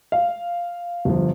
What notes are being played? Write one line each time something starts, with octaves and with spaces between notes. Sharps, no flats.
F5
G1 F3